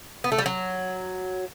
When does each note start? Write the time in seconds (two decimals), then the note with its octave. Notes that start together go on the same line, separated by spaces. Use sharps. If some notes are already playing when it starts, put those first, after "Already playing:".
0.24 B3
0.32 A3
0.38 G3
0.46 F#3